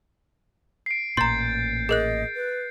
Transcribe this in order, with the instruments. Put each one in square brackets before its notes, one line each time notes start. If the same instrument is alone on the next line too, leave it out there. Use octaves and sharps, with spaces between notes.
[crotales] C7 D7
[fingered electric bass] A1 A#2 [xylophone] A#5 C6 [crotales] G6 A6
[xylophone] G#4 A#4 F#6 [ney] D#5
[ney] B4